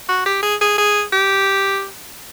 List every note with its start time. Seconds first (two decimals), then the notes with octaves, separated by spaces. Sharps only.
0.09 F#4
0.26 G4
0.43 G#4
0.61 G#4
0.78 G#4
1.13 G4